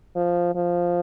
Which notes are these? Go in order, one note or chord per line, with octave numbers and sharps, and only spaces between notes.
F3
F3